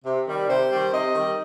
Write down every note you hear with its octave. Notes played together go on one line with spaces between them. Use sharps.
C3
D#3 G3
C3 C5
D#3 G3
C3 D#5
D#3 G3